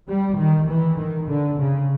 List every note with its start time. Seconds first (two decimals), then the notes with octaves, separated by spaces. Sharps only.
0.08 G3
0.38 D#3
0.69 E3
0.98 D#3
1.28 D3
1.59 C#3